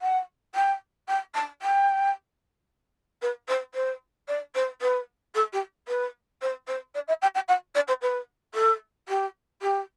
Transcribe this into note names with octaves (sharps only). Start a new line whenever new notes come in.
F#5
G5
G5
A5
G5
B4
C5
C5
D5
C5
B4
A4
G4
B4
C5
C5
D5
E5
G5
G5
F#5
D5
C5
B4
A4
G4
G4